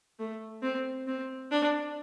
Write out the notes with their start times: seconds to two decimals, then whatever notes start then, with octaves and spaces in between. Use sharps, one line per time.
0.20 A3
0.63 C4
1.07 C4
1.51 D4